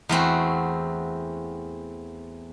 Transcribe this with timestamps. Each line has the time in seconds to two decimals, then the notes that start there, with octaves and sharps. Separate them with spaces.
0.09 E2 A3 C4 F#4